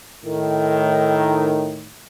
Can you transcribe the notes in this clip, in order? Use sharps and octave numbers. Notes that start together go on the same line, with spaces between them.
A2 D#3